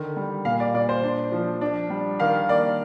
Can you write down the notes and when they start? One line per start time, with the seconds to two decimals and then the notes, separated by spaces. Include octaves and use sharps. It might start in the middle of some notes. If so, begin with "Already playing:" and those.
Already playing: D3 D#3
0.16 G3
0.45 A#2 F5
0.60 D5
0.74 A#2 D5
0.89 C5
1.03 D4
1.32 F3
1.61 D4
1.90 G3
2.20 D#3 F5
2.49 A#3 D5